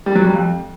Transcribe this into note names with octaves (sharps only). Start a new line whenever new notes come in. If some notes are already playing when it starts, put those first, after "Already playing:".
G3
F#3
G3
F2